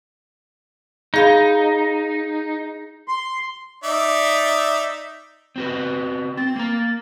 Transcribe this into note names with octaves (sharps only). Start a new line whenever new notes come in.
D#4 G#4 F5 B5
C6
D#4 D5 E5
C4 F#4 B4
C4 A6
A#3 A#5